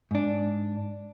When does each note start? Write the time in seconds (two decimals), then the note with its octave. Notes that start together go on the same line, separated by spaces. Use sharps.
0.11 G#2 D4